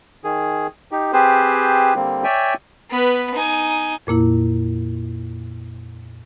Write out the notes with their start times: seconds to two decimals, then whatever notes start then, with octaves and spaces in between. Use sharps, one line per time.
0.24 D#3 G#4
0.91 D#4 G4
1.13 C4 G4 G#4 B4 C5
1.95 D3 G3 A#3 C4
2.24 C#5 D5 E5 G5 G#5
2.91 B3 B4
3.35 D#4 G#5
4.07 F2 A#2 A#3 E4